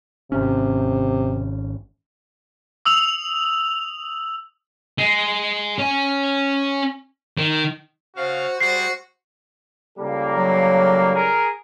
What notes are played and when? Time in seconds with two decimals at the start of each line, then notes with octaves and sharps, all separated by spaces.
0.32 G#1 C3 C#4
2.85 D#6 E6 F7 F#7
4.98 G#3
5.79 C#4
7.38 D#3
8.16 C#3 F#4 C5 F5 F6
8.60 G3 G#3 F#4 C7
9.99 C#2 G3 A#3 A4
10.35 F#3
11.14 G#4 A#4